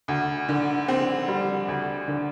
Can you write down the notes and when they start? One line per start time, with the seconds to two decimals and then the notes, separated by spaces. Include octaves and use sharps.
0.08 D2
0.49 D3
0.88 C4
1.28 G3
1.68 D2
2.08 D3